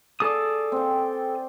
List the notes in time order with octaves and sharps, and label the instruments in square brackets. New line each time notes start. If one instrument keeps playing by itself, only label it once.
[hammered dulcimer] G#4 D5 [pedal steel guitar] A4 D#6
[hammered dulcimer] C4 G5